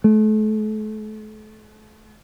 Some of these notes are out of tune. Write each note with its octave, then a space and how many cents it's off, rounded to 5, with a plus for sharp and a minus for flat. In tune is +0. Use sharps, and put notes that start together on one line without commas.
A3 -40